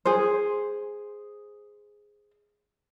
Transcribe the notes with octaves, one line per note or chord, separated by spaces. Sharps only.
G#4 C5